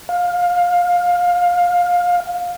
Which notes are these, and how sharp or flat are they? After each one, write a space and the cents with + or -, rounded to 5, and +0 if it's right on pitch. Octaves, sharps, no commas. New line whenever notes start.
F5 +20